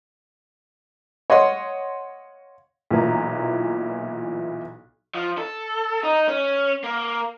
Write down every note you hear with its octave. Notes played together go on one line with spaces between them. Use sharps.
C#5 D#5 F5 F#5 C6
B1 A#2 E3 A#5
F3
A4
D#4
C#4
A#3